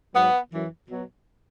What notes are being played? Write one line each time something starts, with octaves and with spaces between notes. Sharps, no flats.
G#2 F#3 B3
F#2 E3
B2 F#3